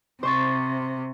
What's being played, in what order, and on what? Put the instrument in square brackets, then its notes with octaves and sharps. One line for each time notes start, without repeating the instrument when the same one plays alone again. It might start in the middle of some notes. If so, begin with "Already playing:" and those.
[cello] C3 [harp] C5 C#6 A6